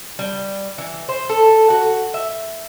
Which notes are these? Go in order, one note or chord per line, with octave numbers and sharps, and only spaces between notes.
G3
E3
C5
A4
F#4
E5